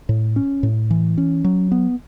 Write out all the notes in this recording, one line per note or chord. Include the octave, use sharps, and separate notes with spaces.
A2
C#4
A2
E3
C#4
F#3
B3